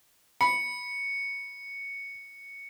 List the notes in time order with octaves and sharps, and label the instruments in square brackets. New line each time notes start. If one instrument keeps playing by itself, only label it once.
[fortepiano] B5 [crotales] C#7